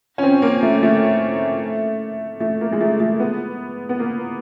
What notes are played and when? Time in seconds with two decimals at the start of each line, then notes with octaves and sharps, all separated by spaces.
0.18 C#4
0.23 C4
0.42 A#3
0.63 A3
0.83 A3
2.40 A3
2.61 A#3
2.72 G#3
2.81 A3
3.00 A3
3.20 B3
3.89 B3
3.99 A#3